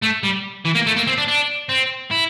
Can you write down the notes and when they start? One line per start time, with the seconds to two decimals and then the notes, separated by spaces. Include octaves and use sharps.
0.03 A3
0.24 G3
0.66 E3
0.75 A#3
0.87 A3
0.96 A#3
1.07 C4
1.18 D4
1.28 D4
1.69 C4
2.11 E4